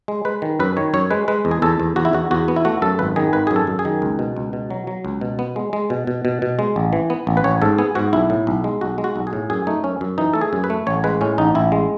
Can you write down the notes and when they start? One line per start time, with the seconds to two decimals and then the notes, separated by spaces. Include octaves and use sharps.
0.08 G#3
0.25 G#3 B4
0.42 D#3
0.60 F#2 B4
0.77 D#3 C#5
0.94 F#2 C#5
1.11 G#3 B4
1.28 G#3 B4
1.45 E2
1.51 G#4
1.62 E2 A4
1.80 E2
1.96 E2 F#4
2.05 E4
2.13 E2 F#4
2.31 E2 F#4
2.48 B3
2.56 E4
2.65 A3 F#4
2.82 F#2 A4
2.99 G#1 B4
3.16 D#3 G#4
3.33 G#1 B4
3.47 F#2 G#4
3.56 A4
3.67 F#2
3.79 G#4
3.85 D#3
4.02 C#2
4.19 B2
4.36 C#2
4.53 B2
4.70 F#3
4.87 F#3
5.05 C#2
5.21 B2
5.39 B3
5.56 G#3
5.73 G#3
5.90 B2
6.07 B2
6.25 B2
6.42 B2
6.59 G#3
6.76 A1
6.93 E3
7.10 B3
7.27 A1
7.37 B4
7.44 A1 C#5
7.62 G#2 A4
7.78 B3 G#4
7.95 G#2 F#4
8.13 B1 E4
8.30 A2
8.47 B1
8.64 G#3
8.81 B1 F#4
8.98 G#3
9.04 F#4
9.16 B1
9.27 G#4
9.33 A2
9.50 F#2 G#4
9.67 A3 D#4
9.84 F#2 C#4
10.01 F#2
10.18 E3 D#4
10.34 A3 A4
10.41 G#4
10.53 F#2
10.64 B4
10.70 A3
10.87 A1 C#5
11.04 G#3 B4
11.21 A2 C#4
11.38 A1 D#4
11.55 A1 E4
11.72 G#3